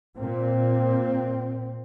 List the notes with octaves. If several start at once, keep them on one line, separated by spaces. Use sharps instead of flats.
A#2 C4